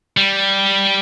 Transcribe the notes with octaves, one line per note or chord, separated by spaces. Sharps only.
G3